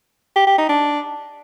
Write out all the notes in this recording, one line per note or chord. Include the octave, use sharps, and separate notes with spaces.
G4
G4
D#4
D4